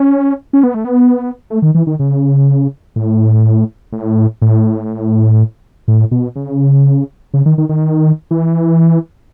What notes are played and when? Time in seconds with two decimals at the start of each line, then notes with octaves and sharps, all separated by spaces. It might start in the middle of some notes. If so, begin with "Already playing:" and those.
Already playing: C#4
0.53 C#4
0.63 B3
0.74 A3
0.85 B3
1.50 A3
1.62 D#3
1.75 E3
1.87 D#3
1.99 C#3
2.96 A2
3.93 A2
4.42 A2
5.88 A2
6.11 B2
6.36 C#3
7.34 C#3
7.46 D#3
7.58 D#3
7.69 D#3
8.31 E3